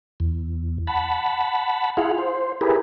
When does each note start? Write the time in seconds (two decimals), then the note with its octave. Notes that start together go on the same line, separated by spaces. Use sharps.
0.20 E2
0.87 F#5 A5 B5
1.97 E4 F4 G#4 F5 F#5
2.18 C5
2.61 E4 G4 G#4 A#4 B4